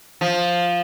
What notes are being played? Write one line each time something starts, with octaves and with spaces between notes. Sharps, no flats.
F3